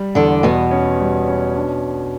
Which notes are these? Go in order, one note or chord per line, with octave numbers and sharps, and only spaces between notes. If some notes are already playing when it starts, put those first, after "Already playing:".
Already playing: G3
E2 D3 D4
E2 B2 B3
C#4
G3
C#4
D4